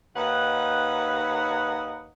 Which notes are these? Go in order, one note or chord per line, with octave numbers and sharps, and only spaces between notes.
D#2 D#4 B4 C#5 F#5